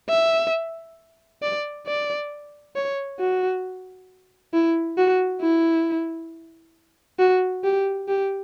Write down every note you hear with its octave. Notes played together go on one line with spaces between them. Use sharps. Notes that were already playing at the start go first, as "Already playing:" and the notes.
E5
D5
D5
C#5
F#4
E4
F#4
E4
F#4
G4
G4